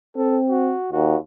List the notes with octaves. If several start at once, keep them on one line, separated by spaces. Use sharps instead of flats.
C4 A4
F#4
D#2 F#4